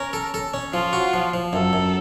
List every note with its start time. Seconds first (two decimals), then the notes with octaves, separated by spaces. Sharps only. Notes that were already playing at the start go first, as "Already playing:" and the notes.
Already playing: C#4 A#4
0.13 A4
0.34 A4
0.54 C#4
0.73 F3 F4
0.93 F#4
1.14 F3
1.34 F3
1.53 F#2 A4
1.73 F#2